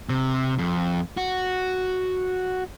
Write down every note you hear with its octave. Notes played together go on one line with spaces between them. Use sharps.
C3
F2
F#4